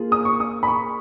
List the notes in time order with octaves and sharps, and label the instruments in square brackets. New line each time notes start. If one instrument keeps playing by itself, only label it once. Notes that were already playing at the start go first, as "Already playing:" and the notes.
Already playing: [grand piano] A#3 F4 G#4
[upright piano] D#6
C#6
D#6
B5
C#6